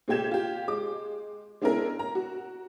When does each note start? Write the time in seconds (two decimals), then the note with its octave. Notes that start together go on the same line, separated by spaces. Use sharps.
0.08 A#2 G#3 A3 G4 G#6 E7
0.31 F4 G4
0.68 G#3 D6
1.62 G#3 B3 C#4 D4 E4 A#4
1.99 A#5
2.15 F#4